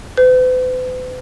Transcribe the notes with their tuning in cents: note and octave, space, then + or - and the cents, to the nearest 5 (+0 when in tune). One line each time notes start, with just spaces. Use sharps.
B4 +45